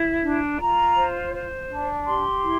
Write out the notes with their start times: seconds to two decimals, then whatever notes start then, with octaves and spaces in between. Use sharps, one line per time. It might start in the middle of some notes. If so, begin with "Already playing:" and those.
Already playing: E4
0.23 D4
0.59 F4 A#5
0.96 C5
1.33 C5
1.69 D4
2.06 G4 C6
2.43 E4